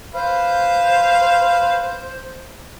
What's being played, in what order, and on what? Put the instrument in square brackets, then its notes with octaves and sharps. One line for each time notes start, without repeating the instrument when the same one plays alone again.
[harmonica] B4 F5 [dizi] C5